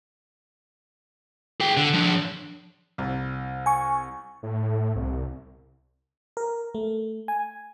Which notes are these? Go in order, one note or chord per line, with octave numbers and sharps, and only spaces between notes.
G#4 G5
D3
F3 D4
C2
G#5 C#6
A2
C2
A#4
A3
G#5